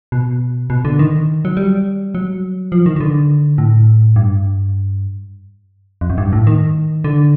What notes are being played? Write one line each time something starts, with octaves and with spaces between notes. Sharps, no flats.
B2
B2
D3
D#3
F#3
G3
F#3
F3
D#3
D#3
D3
A2
G2
F2
F#2
G2
A2
D#3
D3